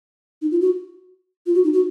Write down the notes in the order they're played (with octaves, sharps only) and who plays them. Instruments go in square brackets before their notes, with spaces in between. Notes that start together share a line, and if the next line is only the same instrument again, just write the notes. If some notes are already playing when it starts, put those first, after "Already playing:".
[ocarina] D#4
F4
F#4
F4
F#4
D#4
F#4